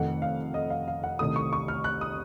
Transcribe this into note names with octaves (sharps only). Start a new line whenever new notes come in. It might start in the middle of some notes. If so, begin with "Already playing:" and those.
Already playing: F1 F2 D#3 A3 F#5
F5
D#5
F5
F5
F#5
C2 C3 D#3 A3 D#6
C#6
C#6
F6
F#6
D#6